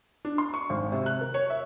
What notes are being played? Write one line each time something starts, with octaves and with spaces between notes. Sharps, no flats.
D4
C6
C#6
G#1
C3
F#6
A#4
C#5
E5